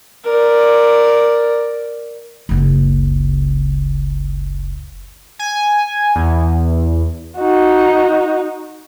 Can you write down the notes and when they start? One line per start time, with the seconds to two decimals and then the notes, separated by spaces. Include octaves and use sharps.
0.25 A#4 D5
2.49 F#1 C#2
5.39 G#5
6.15 E2
7.37 D#4 F#4